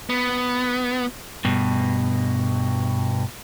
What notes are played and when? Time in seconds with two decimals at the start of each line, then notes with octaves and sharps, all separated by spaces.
0.09 B3
1.45 G2 B2